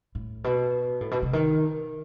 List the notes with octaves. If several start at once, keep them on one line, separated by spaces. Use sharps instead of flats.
A2
B2
A2
B2
C3
D#3